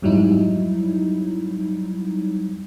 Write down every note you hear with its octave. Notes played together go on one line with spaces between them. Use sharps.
F2 G#2 F#3 G3 D#4 E4